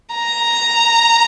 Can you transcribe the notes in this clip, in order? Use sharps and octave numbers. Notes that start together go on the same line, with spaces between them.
A#5